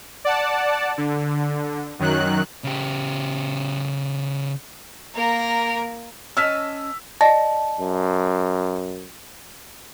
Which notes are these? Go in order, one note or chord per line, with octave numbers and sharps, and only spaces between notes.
D5 F#5 A5
D3
F#2 D#3 F#3 F#6
C#3 G4
A#3 A#4
C#4 D#5 A5 E6 F6 B6
D5 D#5 A5 A#6
F#2